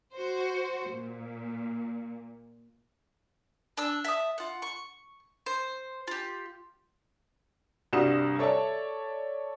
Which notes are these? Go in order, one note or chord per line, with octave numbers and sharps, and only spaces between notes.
F#4 C5
A#2
D4 A5 E6
E5 A5 D#6
F4 F#5
C#6
C5
F4 G4
C2 G2 G3 F#4 D#6 E7
A4 C#5 D5 E5 A5